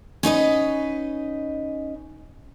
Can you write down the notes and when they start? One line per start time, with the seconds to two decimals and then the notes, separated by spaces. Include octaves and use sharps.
0.23 C#4 D#4 B4 D#5